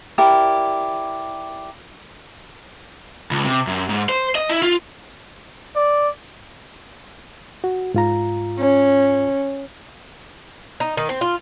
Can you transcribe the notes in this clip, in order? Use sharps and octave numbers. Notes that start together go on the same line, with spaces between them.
E4 G4 A#4 D5
C#2
C3
F#2
G#2
C5
D#5
E4
F4
D5
F#4
G#2 F4 A#5
C#4
D#4
D#3
C4
F4